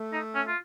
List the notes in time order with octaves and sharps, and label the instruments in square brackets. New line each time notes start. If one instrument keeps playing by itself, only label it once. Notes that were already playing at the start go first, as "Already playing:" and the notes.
Already playing: [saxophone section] A3
[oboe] D#4
C#4
F4